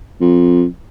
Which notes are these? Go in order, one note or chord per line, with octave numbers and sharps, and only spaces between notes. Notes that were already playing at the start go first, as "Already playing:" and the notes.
F2